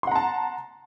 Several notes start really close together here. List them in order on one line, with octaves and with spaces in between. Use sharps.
C6 F#5 A#5 A5